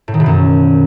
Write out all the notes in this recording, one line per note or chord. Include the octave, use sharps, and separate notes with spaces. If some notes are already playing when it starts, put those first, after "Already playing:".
A2
D#3
B2
F#2